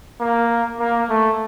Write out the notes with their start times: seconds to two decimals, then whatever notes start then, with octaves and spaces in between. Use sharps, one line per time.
0.20 A#3
0.80 A#3
1.10 A3